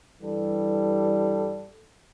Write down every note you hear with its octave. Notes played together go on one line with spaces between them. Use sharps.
G2 E3 G3 A4